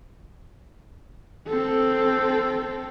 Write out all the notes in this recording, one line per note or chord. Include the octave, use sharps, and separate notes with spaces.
C4 A4